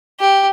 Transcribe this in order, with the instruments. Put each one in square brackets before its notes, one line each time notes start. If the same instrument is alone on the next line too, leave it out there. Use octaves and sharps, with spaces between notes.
[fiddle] G4